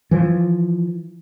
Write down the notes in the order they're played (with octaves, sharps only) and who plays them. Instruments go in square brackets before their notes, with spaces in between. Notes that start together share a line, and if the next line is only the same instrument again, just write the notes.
[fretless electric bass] E3 F3